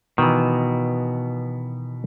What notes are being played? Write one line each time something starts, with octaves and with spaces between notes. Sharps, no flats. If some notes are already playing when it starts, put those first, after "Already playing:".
B2 D#3 E3